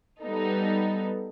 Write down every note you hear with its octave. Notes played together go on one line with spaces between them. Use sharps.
G3 B3 D#4 A4